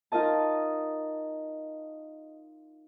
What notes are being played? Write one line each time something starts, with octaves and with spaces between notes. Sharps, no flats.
D#4 F4 A#4 D#5 A5